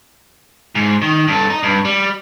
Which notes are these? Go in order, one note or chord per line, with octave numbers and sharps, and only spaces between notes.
G#2
D#3
G2 A4
D#5 A#5
G2
G3